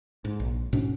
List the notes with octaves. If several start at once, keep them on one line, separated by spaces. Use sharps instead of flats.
G#2
A#1
G#2 B2 C#4 D4